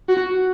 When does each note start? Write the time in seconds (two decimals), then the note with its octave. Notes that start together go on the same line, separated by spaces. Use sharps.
0.09 F#4